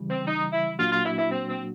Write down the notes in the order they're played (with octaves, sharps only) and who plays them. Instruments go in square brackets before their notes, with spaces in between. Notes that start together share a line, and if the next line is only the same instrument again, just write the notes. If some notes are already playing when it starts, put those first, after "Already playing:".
Already playing: [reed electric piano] C#3 E3 G3
[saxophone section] C4
D#4
E4
[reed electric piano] A#2 F#3 A#3 D4 F#4 [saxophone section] F4
[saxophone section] F4
E4
E4
C4
C4